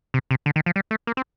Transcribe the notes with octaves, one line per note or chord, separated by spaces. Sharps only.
C3
C3
D3
D#3
F3
G3
A3
A#3
C4